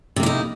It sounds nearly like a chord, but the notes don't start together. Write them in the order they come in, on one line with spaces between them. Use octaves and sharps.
C3 A#3 E4 D#4